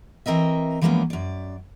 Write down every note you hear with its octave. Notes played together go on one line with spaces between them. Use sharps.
E3 C4 A#4 D#5 E5
E3 F3 G#3 A#3 B3 C#4
F#2 D5